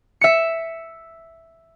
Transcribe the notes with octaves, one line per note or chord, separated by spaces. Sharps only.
E5 C#7